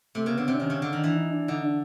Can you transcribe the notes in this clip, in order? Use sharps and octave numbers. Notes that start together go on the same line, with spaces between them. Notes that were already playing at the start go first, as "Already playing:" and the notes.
C3 A3
C#3 A#3
D3 B3
C3 C4
D4
D#3 C#4
C#3
D3 D4
D#3
E3 D4
D#4
D4
D3 D#4
D4